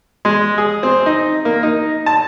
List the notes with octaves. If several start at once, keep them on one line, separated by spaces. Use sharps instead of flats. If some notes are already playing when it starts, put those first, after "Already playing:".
G#3
G#4
C4
D#4
A#3
D#4
A5